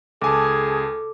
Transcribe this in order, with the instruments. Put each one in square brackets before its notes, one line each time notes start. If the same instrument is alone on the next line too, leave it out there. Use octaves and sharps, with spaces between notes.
[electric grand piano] C#2 G#5 A5 [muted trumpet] G#4 [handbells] A4 [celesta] D6